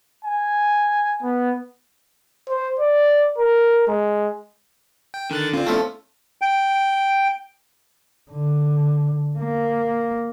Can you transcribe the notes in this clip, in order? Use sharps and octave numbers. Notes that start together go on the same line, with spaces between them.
G#5
B3
C5
D5
A#4
G#3
G5
D3 D#3 F#6 A6
C4 C#4 F4 B4 D5
F3 A3 B3 C#4 D4 E4
G5
D3
A#3